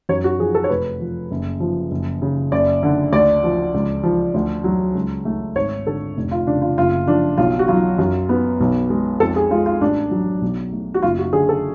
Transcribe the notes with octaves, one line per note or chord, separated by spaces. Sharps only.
F#2 C#5
F#4
F3 G#4
A4
C#5
F1 B4
F3
F#1
F3
F#1
C#3
F#1 D5
D3
D2 D5
F3
C#2
F3
D2
F#3
C#2
A3
G#1 C#5
D3 A4
F1
F4
C#3 D4
F4
F#1 F4
F3 D4
B1 F4
F#4
F#3 F4
F#2
B3
B1
G#3
F2 A4
G#4
G#3 F4
F4
A1 D4
F#3
B1
A3
F#4
F#1 F4
F#4
D3 G#4
A4